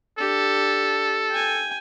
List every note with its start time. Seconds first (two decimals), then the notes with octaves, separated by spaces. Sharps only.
0.19 D4 G4 A4
1.31 G5 G#5